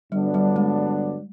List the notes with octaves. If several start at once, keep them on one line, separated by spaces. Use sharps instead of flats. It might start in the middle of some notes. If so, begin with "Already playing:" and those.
G2 D3 F#3 G3 B3 D4
G3
G#3